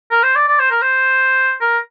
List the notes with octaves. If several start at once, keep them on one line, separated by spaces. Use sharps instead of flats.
A#4
C5
D5
D5
C5
A#4
C5
A#4